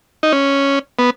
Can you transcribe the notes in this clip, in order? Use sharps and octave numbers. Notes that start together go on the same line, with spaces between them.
D#4
C#4
B3